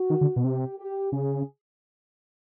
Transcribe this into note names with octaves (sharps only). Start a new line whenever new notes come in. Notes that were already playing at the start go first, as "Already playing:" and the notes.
Already playing: F#4
D#3
D3
B2
C3 G4
G4
C#3 G#4